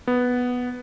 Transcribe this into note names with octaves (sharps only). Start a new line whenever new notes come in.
B3